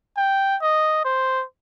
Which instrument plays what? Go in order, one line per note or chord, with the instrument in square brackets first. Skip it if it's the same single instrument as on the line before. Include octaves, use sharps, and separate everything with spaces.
[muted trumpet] G5
D#5
C5